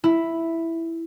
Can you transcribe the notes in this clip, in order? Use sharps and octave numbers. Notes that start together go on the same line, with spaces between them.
E4